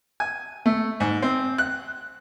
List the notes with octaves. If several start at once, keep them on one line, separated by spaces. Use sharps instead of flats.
G#5
A3
G#2
C4
F#6